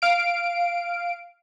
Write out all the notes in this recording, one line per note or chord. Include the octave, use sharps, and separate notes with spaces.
F5 D7